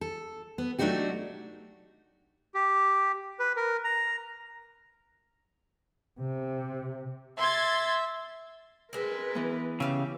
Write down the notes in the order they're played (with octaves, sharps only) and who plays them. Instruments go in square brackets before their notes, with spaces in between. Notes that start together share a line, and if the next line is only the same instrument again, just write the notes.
[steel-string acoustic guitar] A4
B3
F#3 A3 D4 D#4 F#4 G4
[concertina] G4
B4
A#4
A#5
[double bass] C3
[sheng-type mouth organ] E5 [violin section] C6 G#6 A6
[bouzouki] G#3 C4 [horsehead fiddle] A#4 B4
[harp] E3 B3
[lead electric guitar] C#3 [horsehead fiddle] G4 [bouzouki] E5 F5